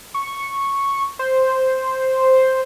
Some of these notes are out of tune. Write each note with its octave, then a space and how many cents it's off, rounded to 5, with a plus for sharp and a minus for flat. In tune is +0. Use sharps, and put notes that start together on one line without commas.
C#6 -5
C5 +0